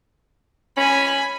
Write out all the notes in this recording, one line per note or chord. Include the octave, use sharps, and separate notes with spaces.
C#4 G#5 B5